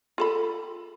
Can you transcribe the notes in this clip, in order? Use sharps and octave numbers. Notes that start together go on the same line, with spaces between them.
F4 A4 B5